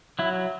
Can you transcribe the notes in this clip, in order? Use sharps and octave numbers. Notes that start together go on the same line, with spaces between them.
F#3 E4